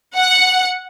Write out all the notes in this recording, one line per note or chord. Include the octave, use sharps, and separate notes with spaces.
F#5